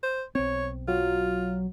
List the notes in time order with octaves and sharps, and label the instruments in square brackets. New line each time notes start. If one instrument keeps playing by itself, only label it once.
[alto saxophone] C5
[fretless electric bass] B1 C4 [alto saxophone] C#5
[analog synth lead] F#3 [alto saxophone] F4